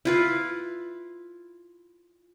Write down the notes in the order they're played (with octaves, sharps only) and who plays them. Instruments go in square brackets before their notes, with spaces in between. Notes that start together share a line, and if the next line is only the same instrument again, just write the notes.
[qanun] E4 F4 B4